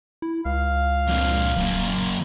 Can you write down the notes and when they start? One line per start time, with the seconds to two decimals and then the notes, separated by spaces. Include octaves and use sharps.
0.22 E4
0.45 C#2 F5
1.08 F2 A#2
1.57 D#1 F#2 A#3